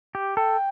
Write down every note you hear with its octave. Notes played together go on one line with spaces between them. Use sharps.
G4
A4 G5